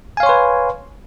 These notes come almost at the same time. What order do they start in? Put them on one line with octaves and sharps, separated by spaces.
G#5 F5 C#5 C6 B4